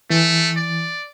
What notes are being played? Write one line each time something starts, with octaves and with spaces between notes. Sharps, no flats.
E3 A3
D5